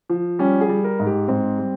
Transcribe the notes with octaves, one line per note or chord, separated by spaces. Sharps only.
F3
G3 C#4
G#4
G3
A#4
G#2
G4
G#2 C4
G3